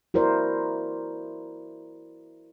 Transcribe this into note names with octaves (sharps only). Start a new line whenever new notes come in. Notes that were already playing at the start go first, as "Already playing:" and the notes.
E4 F#4 A#4 C5 D5